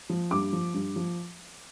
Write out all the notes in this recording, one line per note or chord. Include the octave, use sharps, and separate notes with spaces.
F3
G2 D6
F3
G2
F3